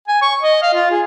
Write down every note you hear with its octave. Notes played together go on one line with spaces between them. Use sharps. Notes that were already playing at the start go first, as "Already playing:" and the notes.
G#5
C#6
D#5
F5
F4
G#4